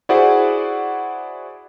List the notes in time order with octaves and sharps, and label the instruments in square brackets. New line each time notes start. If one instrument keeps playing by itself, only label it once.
[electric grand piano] E4 F#4 G#4 C5 D5 F#5